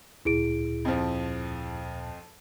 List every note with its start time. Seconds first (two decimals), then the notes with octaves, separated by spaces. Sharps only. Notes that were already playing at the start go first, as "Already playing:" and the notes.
0.25 D2 A#2 E4 G#4 D7
0.85 F2 F3